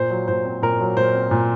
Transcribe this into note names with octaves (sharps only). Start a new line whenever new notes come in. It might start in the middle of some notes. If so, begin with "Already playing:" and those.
Already playing: A#2 C5
F#3
A#2 C5
C4
A#2 A#4
F#3
A#2 C5
C4
A#2